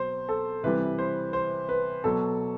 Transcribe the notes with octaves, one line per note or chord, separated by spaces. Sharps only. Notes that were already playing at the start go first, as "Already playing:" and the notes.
Already playing: B2 F#3 C5
A4
C3 E3 G3 B4
C5
C5
B4
B2 F#3 A4